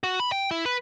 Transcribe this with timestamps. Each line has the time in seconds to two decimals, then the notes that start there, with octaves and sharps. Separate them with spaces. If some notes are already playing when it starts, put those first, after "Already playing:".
0.03 F#4
0.20 B5
0.32 G5
0.51 E4
0.66 B4